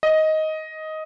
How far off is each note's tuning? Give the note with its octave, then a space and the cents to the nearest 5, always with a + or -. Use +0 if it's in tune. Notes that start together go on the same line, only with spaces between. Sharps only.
D#5 +10